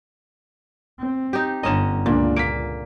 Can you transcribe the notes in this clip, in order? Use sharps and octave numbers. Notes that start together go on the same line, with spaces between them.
C4
D#4 G4
G1 D3 C#4 D#5 A#5 E7
C#2 A#2 A#3 D4
A#3 B6 D7